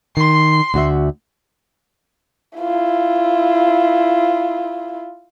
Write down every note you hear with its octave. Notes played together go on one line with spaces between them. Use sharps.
D#3 C6
D2 F#4 E5
E4 F4